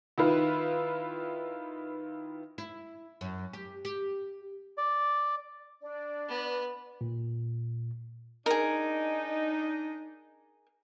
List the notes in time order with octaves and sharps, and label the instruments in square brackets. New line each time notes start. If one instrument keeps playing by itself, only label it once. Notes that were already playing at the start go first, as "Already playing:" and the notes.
[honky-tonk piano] D#3 E4 F4 B4
[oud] E4
F#2
G4
G4
[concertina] D5
[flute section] D4 D5
[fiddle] B3 B4
[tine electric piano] A#2
[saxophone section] D4 D#4 [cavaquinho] G#4 A#4